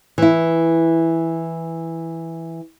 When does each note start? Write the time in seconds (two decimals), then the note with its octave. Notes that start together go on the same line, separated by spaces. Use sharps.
0.18 E3 E4